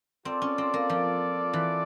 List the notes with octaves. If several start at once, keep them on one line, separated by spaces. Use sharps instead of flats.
C4 F4 A4 D5
C#4
C4
A#3
F3
E3